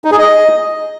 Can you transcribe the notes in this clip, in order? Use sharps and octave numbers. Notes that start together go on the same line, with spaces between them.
D#4
G#4
D#5